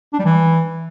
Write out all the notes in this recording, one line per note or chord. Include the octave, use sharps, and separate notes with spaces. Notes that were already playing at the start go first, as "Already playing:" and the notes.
D4
G3
E3